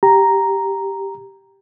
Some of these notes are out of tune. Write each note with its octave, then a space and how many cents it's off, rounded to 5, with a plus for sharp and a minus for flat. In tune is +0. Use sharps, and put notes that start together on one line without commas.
G4 +0 A#5 +0